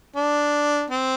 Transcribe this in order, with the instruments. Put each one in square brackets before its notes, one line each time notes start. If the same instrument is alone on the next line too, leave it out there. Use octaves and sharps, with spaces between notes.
[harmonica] D4
C4